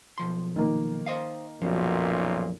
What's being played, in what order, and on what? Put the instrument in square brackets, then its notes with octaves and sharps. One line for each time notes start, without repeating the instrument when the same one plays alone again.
[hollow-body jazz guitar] B1 F3 C6
[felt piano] D#3 A#3
[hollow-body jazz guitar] C5 D#5 F5
[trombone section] B1 F#2 A#2 [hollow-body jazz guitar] F3 F#3 C#4